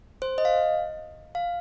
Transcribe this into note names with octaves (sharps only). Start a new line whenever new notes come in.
C5
D#5
F5
F5